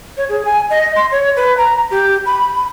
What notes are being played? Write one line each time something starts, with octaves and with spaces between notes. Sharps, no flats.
C#5
G#4
G#5
D#5
C6
C#5
B4
A#5
G4
B5